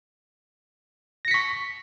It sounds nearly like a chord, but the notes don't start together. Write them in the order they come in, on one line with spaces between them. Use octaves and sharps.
A#6 C#7 B6 C#6